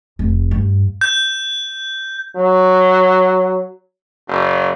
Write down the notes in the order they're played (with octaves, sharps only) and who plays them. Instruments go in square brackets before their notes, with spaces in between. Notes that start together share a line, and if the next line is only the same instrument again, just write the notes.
[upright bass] F1
G2
[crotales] G6
[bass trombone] F#3
F#1